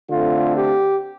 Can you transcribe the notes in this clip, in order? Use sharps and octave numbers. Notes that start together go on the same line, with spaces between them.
D3 A3 C4 F4
G4